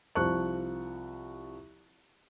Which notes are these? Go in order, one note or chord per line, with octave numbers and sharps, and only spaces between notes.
C2 F3 C5 A5 C#6 F#6